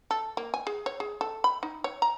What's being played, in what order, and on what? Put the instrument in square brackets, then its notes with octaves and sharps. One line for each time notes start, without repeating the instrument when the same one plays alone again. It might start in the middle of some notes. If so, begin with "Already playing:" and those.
[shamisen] A4
A#3
G#5
G#4
C#5
G#4
A4
B5
D#4
C#5
A#5